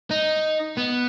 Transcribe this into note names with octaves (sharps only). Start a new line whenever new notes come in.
D#4
B3